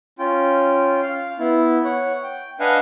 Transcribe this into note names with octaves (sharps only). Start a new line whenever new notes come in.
C#4 F4 G5
F5
B3 E4
C#5 F#5
G5
D4 B4 D#5 F5 F#5 G#5